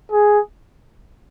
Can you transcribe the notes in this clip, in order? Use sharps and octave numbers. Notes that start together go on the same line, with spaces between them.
G#4